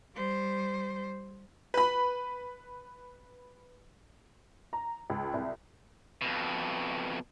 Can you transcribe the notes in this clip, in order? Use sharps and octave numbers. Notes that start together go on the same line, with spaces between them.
G3 C5
B4 B5
A#5
C#2
C2
F2 B2